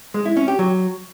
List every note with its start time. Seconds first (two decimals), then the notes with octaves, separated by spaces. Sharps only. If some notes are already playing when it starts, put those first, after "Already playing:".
0.14 G#3
0.26 E4
0.37 C#4
0.48 G4
0.59 F#3